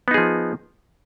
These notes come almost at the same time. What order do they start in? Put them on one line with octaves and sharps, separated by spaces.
B3 D#4 G#4 F3